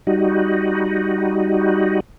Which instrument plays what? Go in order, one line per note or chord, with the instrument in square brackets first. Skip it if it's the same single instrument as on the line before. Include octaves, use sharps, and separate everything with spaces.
[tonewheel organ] G3 D#4 F#4